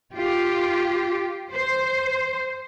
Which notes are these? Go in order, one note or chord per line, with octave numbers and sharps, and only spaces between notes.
F4 G4
C5